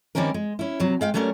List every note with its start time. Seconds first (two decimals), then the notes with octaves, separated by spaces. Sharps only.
0.15 D#3 G3 A#3 C4 C#4 A#4
0.34 G#3
0.59 C#4 E4
0.80 C3 F#3
1.01 G#3 F5 G5
1.14 F#3 G3 A3 C#4 A#4